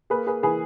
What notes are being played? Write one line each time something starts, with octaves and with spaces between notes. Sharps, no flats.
A#3 G#4 B4
G#4 B4
E3 G#4 B4